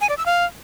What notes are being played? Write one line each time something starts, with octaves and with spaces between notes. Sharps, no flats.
G#5
D5
E6
F5